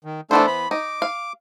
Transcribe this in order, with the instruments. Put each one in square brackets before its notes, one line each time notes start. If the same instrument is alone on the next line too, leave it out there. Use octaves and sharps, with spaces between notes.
[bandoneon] D#3
[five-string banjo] E3 B3 C5 [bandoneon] A3 D4 A4
[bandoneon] B5
[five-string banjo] D#4 [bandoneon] D6
[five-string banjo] F5